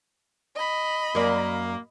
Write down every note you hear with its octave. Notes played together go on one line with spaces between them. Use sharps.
D#5 B5
F#2 A#3 D5